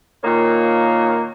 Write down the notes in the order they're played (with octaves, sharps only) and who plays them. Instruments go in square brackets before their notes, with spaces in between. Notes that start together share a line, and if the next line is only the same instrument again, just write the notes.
[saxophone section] A#2 D#3 A#3 C#5